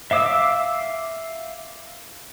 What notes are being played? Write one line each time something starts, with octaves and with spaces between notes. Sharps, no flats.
E5 F5 D6 E6